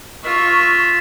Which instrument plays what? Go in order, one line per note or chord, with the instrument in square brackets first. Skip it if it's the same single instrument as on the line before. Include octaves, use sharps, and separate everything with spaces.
[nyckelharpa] F4 E5 [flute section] C#6